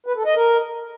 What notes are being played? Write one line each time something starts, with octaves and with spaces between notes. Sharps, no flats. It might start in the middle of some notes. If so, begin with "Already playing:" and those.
B4
A4
D#5
A#4